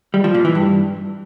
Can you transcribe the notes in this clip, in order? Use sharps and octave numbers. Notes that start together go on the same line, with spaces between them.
G3
F3
A#2
E3
G2